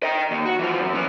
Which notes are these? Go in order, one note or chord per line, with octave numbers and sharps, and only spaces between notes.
D#5 G5
D#2
F#4
E3 F3
F#2
A2 E3